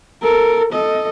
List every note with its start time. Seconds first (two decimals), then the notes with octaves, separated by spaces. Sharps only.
0.22 A4 A#4
0.73 A4 D#5